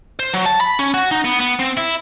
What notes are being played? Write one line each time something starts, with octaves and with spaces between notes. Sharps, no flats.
C5
F#3
A5
B5
C#4
F#4
D#4
B3
B3
C4
E4